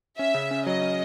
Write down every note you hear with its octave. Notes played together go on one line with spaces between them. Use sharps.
C#4 E5
C#3
C#4
F#3 D#5
C#4